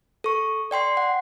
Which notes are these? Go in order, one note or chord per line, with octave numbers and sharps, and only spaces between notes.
A4 C#6
D5 G5 C6 C7
F#5